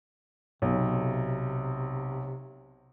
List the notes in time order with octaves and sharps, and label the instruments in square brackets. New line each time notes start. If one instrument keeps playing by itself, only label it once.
[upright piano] B1 [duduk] C3